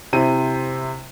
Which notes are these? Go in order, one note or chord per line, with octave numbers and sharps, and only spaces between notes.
C3 E4 C5 D#7